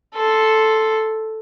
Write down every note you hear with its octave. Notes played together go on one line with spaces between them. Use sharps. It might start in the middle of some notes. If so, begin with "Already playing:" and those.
A4 C6